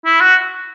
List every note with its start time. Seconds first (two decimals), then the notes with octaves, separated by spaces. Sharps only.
0.05 E4
0.21 F#4